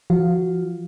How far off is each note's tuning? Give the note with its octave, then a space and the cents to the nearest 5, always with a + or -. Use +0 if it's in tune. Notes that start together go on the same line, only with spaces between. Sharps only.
F3 -25 F#4 +0 F5 +0